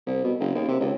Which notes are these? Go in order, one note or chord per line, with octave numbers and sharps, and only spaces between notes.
C2
B2
F#1
D#2
C3
C#2